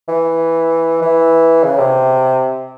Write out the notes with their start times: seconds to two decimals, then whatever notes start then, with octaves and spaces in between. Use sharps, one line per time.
0.08 E3
1.02 E3
1.64 C#3
1.79 C3